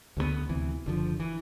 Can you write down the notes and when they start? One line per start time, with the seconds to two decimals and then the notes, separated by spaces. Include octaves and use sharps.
0.17 D2 D3 F#3 B3
0.49 D2 C3 E3
0.86 F#1 D3 F3
1.20 E3